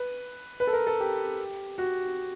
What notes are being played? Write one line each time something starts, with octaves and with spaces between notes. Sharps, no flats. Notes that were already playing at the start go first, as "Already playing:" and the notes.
Already playing: B4
B4
A4
A#4
A4
G4
F#4